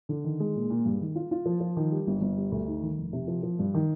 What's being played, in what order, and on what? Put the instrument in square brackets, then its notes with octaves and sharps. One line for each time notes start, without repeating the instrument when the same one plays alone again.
[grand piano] D3
D#3
G#3
A#2
A#2
G2
D#3
F4
F4
F3
F3
D#3
G3
G1
G1
G3
D2
D#4
D#3
F1
C3
F3
F3
G2
D#3